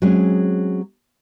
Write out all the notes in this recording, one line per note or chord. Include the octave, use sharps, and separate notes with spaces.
F#3 G#3 C4 C#4 G#4